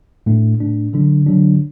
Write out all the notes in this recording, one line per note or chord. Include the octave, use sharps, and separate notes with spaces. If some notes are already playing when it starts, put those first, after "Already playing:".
A2 A3 D4
A2 A3 D4
D3 F#3 D4
D3 F#3 D4